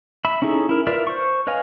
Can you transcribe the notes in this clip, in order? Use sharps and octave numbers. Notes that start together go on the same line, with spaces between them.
E5 B5
C#4 D#4 E4 G#4 A4
E4 A#4
F4 A#4 B4 D5 E5
C5 C#6
B4 C#5 D#5 F5 G#5